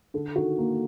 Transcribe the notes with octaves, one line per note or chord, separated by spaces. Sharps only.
D3 A4
D#3 F#4
A#3